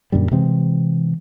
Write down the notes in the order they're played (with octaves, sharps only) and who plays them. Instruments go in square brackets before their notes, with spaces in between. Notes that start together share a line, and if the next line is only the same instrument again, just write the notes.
[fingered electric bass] F#2 A#2 D3 G3
C3 E3 G#3 C4